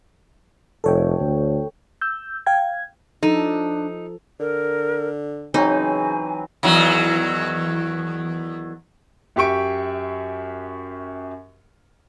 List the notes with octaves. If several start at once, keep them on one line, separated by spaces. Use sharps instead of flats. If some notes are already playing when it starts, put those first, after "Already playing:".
F1 A4 C#5 G5
D2
E6 G6
F5 G5 G#6
F3 D4 D#4 A4
D3 A#4
C#3 E3 F#3 C4 D#4 G#5
E2 D#3 F#3
F#2 G4 E5 C#6 D7